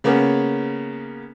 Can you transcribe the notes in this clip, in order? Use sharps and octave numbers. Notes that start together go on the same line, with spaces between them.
C#3 A#3 B3 C#4